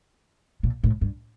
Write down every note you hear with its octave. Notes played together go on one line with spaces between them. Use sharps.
A#2
A2
G2